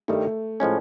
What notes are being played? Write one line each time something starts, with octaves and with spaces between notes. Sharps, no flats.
G2 D#3 G3 A3
A2 F3 G#3 C#4